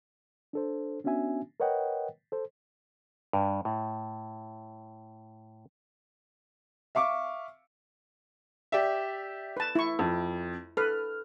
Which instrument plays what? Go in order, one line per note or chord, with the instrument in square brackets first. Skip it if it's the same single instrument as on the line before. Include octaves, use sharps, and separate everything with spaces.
[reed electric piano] D4 A4 C5
B3 C#4 D4 F#4 E5 G#5
A#4 B4 C#5 D#5 F#5 G5
A4 C5
[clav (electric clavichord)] G2
A2
[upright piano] E5 F5 C#6 D6
[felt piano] G4 D5 E5
[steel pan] B4 A5
E4 C#6
[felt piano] F2
[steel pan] A4 B4 [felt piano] F6